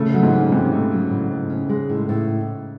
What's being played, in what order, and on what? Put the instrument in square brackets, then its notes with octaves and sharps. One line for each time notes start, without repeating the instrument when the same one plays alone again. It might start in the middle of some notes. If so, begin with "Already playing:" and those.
Already playing: [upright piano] C#3 [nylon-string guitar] A3
[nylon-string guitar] F#3
[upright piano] G#2
[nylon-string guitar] C#4
[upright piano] G#2 [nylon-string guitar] C3
[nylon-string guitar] A3
F#3
A2
A2
C#4
G#3
A2
A2